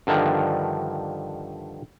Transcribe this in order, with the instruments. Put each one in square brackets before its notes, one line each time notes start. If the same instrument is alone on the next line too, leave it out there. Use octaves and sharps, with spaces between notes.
[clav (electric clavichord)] G2 D3 D#3 F3